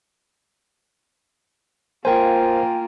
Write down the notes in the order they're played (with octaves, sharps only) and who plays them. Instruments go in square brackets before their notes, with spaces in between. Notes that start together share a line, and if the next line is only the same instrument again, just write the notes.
[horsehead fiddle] A#3 F4 [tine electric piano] A#4 C5 [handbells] G5 G#5